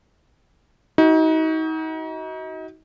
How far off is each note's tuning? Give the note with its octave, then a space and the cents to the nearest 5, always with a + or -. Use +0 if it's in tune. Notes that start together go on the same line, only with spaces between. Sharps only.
D#4 +35 F#4 +20